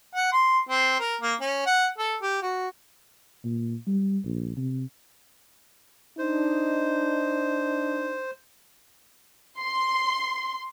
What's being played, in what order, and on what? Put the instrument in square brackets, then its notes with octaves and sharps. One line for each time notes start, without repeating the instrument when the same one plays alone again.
[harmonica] F#5
C6
C4
A#4
A#3
C#4
F#5
A4
G4
F#4
[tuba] A#2
G3
A#1
C3
[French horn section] D4 D#4 [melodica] C5
[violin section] C6